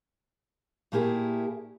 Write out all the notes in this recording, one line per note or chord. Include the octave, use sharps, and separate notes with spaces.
A#2 A3 A#3 E4 G4 G#4